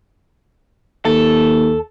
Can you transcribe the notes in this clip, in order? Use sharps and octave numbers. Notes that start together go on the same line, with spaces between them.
D#2 A4